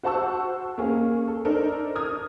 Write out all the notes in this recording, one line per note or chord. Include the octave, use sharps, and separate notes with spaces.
F#4 C5 F#5 A5 C#6 E6
A#3 C#4 G#4
A4
D4 D#4 A4 A#4 C5
D#6 F6 G#6